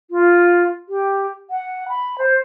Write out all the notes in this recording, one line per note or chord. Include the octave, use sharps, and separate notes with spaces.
F4
G4
F#5
B5
C5